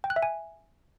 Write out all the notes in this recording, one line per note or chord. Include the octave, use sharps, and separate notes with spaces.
G5
F#6
E5
G#5